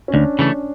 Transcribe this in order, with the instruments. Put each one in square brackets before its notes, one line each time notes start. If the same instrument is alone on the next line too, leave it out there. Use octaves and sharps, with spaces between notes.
[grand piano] C#4
[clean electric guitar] D2 [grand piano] D4
[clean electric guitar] C#3 E3 A3